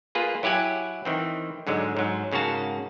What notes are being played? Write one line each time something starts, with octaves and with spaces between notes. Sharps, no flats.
A#3 F4 G#4 B4
F#3 E4 G4 F#5 G#5
D#3 E3 C4
G#2 D3 F#3 G#3
G#2 F#3
G#2 C#3 A#3 F#4 A5